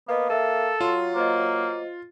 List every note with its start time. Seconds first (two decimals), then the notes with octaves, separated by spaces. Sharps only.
0.09 A#3 B3 B4 D#5
0.30 A4 A#4 E5
0.81 F#3 F4 C6
1.16 A#3 C5 D#5